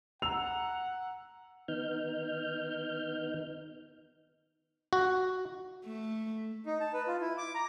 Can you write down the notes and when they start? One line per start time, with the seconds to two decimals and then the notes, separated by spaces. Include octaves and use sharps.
0.22 F#5 A#5 E6 F7
1.68 D#3 B3 D#4 F6 G6
4.93 F#4
5.85 A3
6.66 D#4
6.80 A5
6.94 B4
7.07 F4
7.21 E4
7.38 D6
7.55 A#5